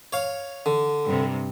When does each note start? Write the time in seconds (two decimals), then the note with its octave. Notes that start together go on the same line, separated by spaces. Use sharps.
0.13 C#5 F5
0.66 D3
1.05 G2 C3